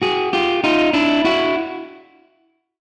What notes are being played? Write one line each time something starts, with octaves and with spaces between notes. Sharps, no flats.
F#4 G#4
F4 G4
D#4 F4
D4 E4
E4 F#4